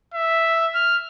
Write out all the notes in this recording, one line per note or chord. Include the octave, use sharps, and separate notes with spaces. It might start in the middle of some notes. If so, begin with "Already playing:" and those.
E5
F6